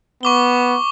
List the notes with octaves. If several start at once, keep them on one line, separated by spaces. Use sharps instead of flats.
B3 C#6 D6 G7